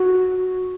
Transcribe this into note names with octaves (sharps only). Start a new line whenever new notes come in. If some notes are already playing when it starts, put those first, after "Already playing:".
Already playing: F#4